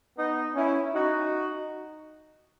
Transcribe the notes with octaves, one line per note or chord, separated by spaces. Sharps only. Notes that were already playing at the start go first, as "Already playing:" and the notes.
B3 D#4
C#4 E4
D#4 F#4